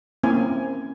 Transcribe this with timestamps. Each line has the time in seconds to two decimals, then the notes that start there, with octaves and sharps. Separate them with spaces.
0.23 A#3 C4 C#4 E4 G#5